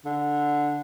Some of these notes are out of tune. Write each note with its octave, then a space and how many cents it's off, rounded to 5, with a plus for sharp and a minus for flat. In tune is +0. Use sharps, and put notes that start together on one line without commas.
D3 +0